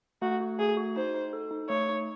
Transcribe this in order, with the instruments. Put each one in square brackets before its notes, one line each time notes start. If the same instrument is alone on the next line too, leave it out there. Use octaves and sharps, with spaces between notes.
[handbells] A3 [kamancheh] F#4
[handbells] F#4
[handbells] A3 [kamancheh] G#4
[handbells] F#4
[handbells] D#4 [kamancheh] C5
[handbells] D#4
A4
D#4
[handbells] A3 [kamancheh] C#5
[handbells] D#4